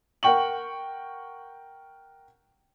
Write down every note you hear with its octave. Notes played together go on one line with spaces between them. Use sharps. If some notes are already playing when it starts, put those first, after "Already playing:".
A#4 F#5 G5 C#6 F#7